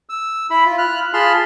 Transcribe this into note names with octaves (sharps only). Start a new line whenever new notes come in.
E6
E4 B5
F4
F6 F#6
F4 G#4 A5 B5 C6 F6